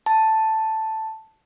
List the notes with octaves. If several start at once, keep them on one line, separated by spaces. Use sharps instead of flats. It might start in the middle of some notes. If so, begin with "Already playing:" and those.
A5